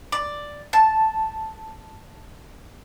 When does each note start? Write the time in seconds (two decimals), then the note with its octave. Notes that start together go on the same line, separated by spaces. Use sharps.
0.12 D5
0.73 A5